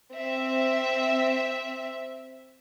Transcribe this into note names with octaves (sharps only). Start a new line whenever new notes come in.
C4 E5